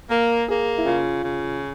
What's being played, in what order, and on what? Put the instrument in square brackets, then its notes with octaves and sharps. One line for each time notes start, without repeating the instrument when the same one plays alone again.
[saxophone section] A#3
[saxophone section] A#3 [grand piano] G#4
[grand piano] E4
[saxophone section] C#3 [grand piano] F4
[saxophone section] C#3